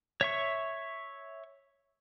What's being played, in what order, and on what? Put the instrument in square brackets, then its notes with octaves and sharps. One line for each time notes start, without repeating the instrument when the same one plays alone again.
[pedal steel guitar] C#5 E5 C#6